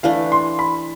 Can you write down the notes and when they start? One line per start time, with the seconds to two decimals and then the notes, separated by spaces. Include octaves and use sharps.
0.03 E3 A3 D4 F5
0.32 C6
0.59 B5